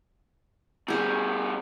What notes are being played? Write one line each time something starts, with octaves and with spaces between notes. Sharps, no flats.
B2 G3 G4 G#4